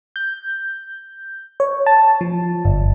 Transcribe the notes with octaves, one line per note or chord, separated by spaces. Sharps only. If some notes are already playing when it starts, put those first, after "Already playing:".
G6
C#5
A5
F3
G1